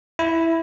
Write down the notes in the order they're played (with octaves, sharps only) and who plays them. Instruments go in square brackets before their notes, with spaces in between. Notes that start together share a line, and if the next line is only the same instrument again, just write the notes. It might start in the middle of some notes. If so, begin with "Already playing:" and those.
[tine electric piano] E4